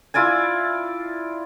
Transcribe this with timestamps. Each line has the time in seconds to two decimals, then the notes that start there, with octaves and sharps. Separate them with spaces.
0.14 E4 F4 D5 G#5